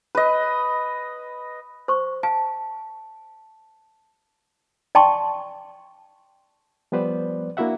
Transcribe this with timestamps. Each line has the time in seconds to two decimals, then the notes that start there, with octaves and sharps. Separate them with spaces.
0.15 B4 D#5
1.88 C5 C#6
2.23 F5 A5
4.95 D5 G5 A5 C6 C#6
6.92 F3 G3 B3 B4 C5 D5
7.57 A#3 D4 E4 F#4 E5 F#5